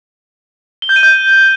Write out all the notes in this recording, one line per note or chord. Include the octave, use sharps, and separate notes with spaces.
G7
G6
D#7
G6